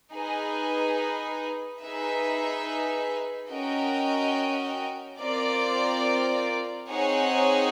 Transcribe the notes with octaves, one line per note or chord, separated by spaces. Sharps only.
D#4 G#4 B4
D#4 G#4 B4 E5
C#4 F#4 A#4 D#5 G5
C4 F4 A#4 D5
C4 D#4 G#4 C#5 F#5